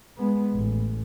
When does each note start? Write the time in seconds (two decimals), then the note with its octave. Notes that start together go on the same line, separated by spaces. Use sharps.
0.17 G#3 B3
0.53 A1